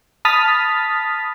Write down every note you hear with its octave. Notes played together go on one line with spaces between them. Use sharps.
A5 B5 D#6 F6 A6 B6